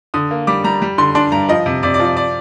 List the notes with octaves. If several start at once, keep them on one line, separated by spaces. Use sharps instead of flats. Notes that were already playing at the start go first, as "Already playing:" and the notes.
D3 D#6
A#3
G3 D6
G3 A#5
G3
D3 C6
D4 C6
G2 A#5
F3 D#5
C3
C3 D5
D5
F3
D5
D5